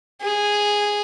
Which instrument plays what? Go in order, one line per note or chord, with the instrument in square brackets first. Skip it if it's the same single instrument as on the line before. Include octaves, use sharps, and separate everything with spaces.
[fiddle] G#4